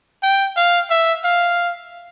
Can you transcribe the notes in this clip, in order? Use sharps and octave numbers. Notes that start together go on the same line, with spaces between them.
G5
F5
E5
F5